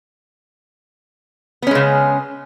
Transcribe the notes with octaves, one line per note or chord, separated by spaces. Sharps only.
C#3 G#3 B3 C#4